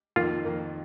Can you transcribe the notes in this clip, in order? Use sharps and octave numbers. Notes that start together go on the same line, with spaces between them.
F2 D#3 A#3 F4
F2 D#3 A#3